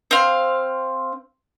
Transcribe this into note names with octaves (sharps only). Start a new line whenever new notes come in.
C4 F5